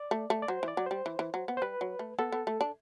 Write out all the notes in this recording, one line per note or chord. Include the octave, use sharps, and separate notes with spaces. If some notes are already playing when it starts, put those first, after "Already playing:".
Already playing: D5
A3
A3
D5
F#3 C5
E3
D5
F#3
G3 C5
E3
E3
F#3
B3
C5
G3 B4
F#3
A3
B3 A4
B3
A3
D4